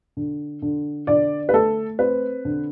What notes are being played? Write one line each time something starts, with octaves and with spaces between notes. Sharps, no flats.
D3
D3
D3 D5
B4
A3 A4
C4 B4
D3